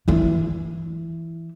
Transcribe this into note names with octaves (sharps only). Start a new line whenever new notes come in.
E3 E4